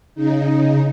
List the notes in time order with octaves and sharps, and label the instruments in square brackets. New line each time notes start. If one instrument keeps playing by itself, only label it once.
[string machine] C#3 D#4